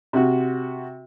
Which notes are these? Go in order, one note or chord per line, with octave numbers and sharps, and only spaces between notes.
C3 F#4